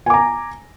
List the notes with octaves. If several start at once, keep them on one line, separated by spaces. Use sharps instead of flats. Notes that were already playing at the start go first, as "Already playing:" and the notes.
G#5 A#5 D6